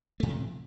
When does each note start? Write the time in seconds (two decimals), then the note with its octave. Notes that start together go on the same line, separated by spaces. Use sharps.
0.20 A3
0.23 A2
0.26 F3
0.28 C3